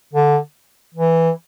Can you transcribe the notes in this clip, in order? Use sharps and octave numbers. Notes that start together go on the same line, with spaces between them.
D3
E3